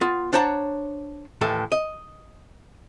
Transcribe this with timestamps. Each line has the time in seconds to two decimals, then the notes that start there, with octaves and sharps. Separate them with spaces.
0.01 B3 F4
0.33 D4 C5 C#5 F#5 A5 A#5
1.41 D#2 A2 E3 A4
1.72 D#5